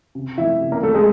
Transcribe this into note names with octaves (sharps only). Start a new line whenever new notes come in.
C3
F3 A3 E4 E5
C3
A#3 A#4
F3 A3 A4
G#3 G#4